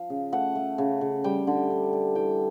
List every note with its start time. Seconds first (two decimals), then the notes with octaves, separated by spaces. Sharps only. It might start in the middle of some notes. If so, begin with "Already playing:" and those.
Already playing: F3 F5
0.10 C#3
0.32 A3 F#5
0.55 A3
0.78 C#3
1.01 C#3
1.24 G3 G5
1.47 D3
1.70 D3
1.93 G3
2.15 E3 G5